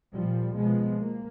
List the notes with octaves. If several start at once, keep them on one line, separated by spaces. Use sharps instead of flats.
A#2 F3 G3
B2 F3 G#3 B3
A#3